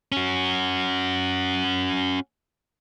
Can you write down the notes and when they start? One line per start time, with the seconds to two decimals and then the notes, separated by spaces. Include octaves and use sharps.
0.12 C#4 F#4